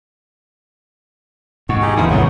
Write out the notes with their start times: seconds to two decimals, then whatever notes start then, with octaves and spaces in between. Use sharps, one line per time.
1.69 G#2 F#4
1.82 D#4 G4 G#4
1.97 E2 D3 E4 F4
2.10 G#1 C3 F#3 G3 B3